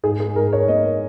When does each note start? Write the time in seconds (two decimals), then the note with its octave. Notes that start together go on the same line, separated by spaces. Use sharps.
0.03 G#2 G#4
0.20 G#4
0.36 G#2 A#4
0.53 C#5
0.68 A#3 D#5